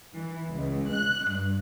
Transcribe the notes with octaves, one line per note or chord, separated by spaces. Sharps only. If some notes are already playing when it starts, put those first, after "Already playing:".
E3
C#2
F#6
G2